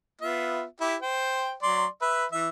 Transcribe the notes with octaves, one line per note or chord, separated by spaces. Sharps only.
B3 F4 E5
E4 G4
C5 G5
F#3 D5 C6
B4 E5
E3 E5